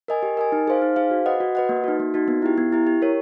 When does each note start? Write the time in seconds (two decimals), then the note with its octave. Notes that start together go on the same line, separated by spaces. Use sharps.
0.08 A#4 D#5 G#5
0.23 G4
0.37 A#4 D#5 G#5
0.52 D#4
0.68 G#4 C5 F5
0.82 D#4
0.96 G#4 C5 F5
1.11 F#4
1.26 B4 D#5 F#5
1.40 F#4
1.55 B4 D#5 F#5
1.69 A#3
1.84 D#4 F#4
2.00 A#3
2.14 D#4 F#4
2.28 B3
2.42 E4 G4
2.58 B3
2.72 E4 G4
2.87 G4
3.02 A#4 C#5